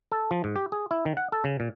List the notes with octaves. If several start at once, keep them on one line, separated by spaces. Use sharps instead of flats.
A4
F3
G#2
G4
G#4
E4
D#3
F#5
A4
C#3
A#2